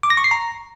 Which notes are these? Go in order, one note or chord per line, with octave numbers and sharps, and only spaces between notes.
D6
A#6
C#6
C7
A#5